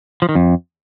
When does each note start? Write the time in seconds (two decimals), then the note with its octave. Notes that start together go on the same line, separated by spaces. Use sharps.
0.22 F3
0.29 D#3
0.35 F2